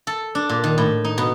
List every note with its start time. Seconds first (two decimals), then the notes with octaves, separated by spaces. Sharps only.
0.07 A4
0.35 D4
0.49 A#2
0.64 D#3
0.78 A2
1.05 D#4
1.18 B2